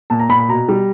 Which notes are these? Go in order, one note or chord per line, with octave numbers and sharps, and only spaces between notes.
A#2 A5
A#5
A#2 B5
B5
B2 A#5
G3